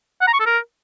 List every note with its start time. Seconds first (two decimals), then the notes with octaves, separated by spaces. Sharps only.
0.21 F#5
0.27 A#5
0.33 C#6
0.40 A4
0.46 A#4